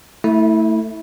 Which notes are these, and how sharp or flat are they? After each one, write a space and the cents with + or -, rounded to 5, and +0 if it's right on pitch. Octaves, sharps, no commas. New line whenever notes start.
A3 +15 E4 -20